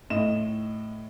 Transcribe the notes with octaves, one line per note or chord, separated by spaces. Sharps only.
A2 D#5 E7